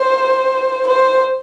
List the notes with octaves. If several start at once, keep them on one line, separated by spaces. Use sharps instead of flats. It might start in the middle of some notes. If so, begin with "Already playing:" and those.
Already playing: C5
C5